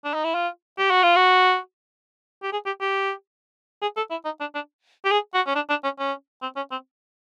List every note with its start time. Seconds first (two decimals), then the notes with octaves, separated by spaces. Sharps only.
0.05 D4
0.14 D#4
0.24 E4
0.34 F4
0.78 G4
0.90 F#4
1.03 F4
1.16 F#4
2.43 G4
2.52 G#4
2.66 G4
2.81 G4
3.82 G#4
3.97 A4
4.10 E4
4.25 D#4
4.40 D4
4.55 D4
5.05 G4
5.11 G#4
5.34 F#4
5.47 C#4
5.55 D4
5.69 D4
5.84 C#4
5.99 C#4
6.42 C4
6.56 C#4
6.71 C4